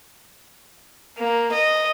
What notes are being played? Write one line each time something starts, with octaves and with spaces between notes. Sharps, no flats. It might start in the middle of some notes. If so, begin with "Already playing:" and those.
A#3
D#5